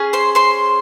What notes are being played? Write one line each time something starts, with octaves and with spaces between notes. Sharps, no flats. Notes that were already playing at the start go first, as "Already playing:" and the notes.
Already playing: C#4 G#4
C5 C6
C5 C6